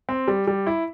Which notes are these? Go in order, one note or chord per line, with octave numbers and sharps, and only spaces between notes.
C4
G3
G3
E4